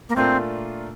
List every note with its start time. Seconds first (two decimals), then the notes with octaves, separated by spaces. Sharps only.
0.09 A#3
0.16 A#2 A3 C4 D4 F4 A#4